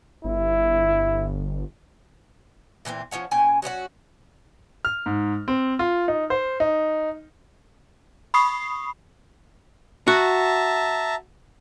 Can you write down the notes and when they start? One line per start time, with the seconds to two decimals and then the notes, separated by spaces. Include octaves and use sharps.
0.25 G1 E4
2.85 A#2 E3 B3 C4
3.11 F3 C#4 C#5 F#5
3.31 A#2 C#4 G5 G#5
3.62 F#3 C#4 D4 F#4
4.85 F6
5.06 G#2
5.48 C4
5.79 F4
6.08 D#4
6.30 C5
6.60 D#4
8.34 B5 C#6 D#6 C7
10.08 F#4 E5 A5 A#5